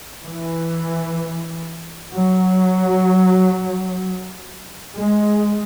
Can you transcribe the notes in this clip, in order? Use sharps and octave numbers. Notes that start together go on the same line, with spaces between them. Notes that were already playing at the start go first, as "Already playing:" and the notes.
E3
F#3
G#3